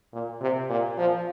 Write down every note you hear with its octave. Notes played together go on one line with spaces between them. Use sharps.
A#2
C3
A#2
F3